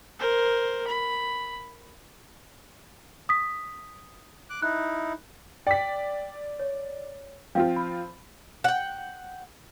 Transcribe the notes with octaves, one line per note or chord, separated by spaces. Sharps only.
A#4 C5
B5
D#6 B6
D6 F#6
D#4 E4 F#6
D5 G5 B6
C#5
F3 C4 F4 F5 G5
B5
F#5 G5